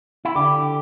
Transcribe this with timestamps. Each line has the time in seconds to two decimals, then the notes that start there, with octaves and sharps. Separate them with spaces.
0.25 E4
0.35 D3 G4